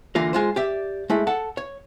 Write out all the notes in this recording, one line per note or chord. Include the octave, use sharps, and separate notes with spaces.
D3 E3 A#3 F4 A#4
G#3 F4 C5
G4 D5 E5
G#3 A3 E4
A4 F#5 A5
C#5